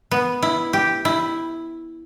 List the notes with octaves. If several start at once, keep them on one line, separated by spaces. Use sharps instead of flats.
B3
E4
G4
E4